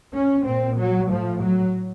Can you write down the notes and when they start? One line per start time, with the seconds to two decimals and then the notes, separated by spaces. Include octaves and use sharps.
0.14 C#4
0.45 A#2 C4
0.78 F#3
1.10 A2 F3
1.43 F#3